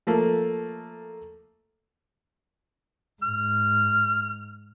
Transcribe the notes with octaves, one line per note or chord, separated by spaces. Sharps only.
F3 A3 A#3
G#2 F6